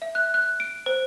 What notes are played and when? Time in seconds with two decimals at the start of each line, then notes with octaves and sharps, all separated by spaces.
0.02 E5
0.15 F#6
0.34 F#6
0.60 D7
0.86 C5